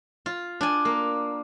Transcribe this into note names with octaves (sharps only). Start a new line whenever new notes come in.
F4
D4 G#5
A#3